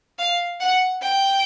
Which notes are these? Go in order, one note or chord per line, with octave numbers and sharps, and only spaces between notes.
F5
F#5
G5